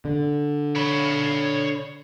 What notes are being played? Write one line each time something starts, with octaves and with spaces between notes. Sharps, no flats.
D3
C#5 B5